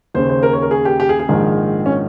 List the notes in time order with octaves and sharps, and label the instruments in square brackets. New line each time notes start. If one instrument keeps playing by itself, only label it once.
[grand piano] D#2 C#3 C5
C5
A#4
C#5
A#4
G#4
G4
G4
G#4
G#4
A#1 G#2 D#3
C#4